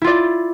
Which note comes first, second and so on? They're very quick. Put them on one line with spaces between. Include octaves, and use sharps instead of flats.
E4 F4 D5